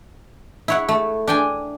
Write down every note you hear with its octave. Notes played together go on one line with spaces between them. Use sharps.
E4 C#5 F#5
A3
D4 G5 G#5